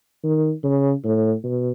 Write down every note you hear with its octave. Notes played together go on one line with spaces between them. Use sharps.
D#3
C#3
A2
B2